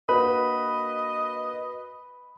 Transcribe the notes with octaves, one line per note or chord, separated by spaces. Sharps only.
A#3 D4 F#4 B4 D#5 B5